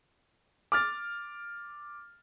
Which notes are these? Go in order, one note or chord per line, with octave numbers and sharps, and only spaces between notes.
D6 F6 A6